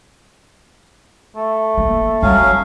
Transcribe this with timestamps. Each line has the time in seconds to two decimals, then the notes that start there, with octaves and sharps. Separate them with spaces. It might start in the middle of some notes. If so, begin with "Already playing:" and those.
1.36 A3
1.78 A#3
2.23 F#3 G3 C#4 F5